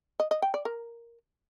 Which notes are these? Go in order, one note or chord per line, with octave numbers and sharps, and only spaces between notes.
D#5
D#5
G5
D5
A#4